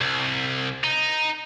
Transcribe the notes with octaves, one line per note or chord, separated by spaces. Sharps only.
C2
D#4